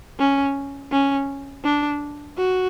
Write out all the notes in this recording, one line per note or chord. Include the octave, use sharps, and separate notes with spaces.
C#4
C#4
D4
F#4